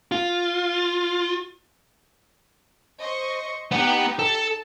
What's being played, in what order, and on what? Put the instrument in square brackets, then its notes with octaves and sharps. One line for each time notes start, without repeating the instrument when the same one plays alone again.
[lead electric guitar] F4
[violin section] C5 D#5 C#6
[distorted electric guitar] B3 F#5 [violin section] D#4 G4
[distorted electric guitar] A4 [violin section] A5